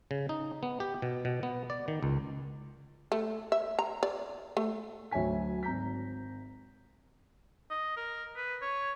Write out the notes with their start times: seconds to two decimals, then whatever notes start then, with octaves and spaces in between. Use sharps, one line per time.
0.11 C#3
0.29 D#4
0.63 B3
0.80 G4
1.02 B2
1.25 B2
1.43 B3
1.70 D5
1.88 D#3
2.03 C#2
3.12 A3
3.52 E5
3.79 A#5
4.03 D5
4.57 A3
5.12 D2 F#3 C#5 E5 G#5 B6
5.63 G#1 A#5 G6 B6
7.70 D#5
7.97 A#4
8.36 B4
8.62 C#5